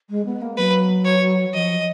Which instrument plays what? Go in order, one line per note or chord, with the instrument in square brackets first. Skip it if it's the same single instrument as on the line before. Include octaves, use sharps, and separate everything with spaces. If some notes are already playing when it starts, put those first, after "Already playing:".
[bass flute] G#3
B3
A#3
[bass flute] F#3 [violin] B4
[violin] C#5
[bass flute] F3 [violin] D#5